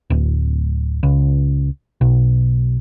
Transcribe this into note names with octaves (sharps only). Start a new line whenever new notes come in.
D1
C#2
B1